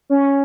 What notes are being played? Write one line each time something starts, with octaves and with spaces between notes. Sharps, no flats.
C#4